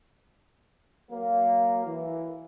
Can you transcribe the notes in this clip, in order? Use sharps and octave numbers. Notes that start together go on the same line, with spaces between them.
F#3 A#3
E3